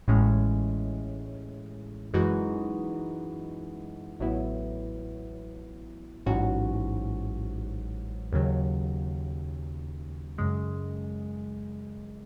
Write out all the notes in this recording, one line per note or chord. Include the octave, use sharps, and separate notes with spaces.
A1 A2 G#3 C#4
F#2 E3 G#3 D#4 F#4
A1 A2 F#3 B3 E4
A1 G#2 F#3 C#4 F#4
D#2 C#3 F#3
F#2 C#3 G#3